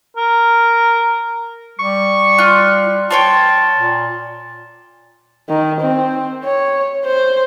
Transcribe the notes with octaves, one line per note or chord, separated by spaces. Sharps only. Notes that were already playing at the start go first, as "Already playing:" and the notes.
A#4
G3 C#6
F4 F#6
F4 C#5 G5 A5
A#2
D#3
C4
C#5
C5